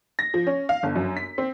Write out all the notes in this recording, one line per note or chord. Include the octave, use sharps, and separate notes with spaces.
A#6
F3
C#4
F5
G1
F#2
B6
C4